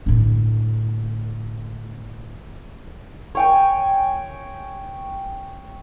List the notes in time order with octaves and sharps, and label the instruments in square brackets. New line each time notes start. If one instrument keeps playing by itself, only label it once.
[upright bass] A2 D3
[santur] C#5 G5 G#5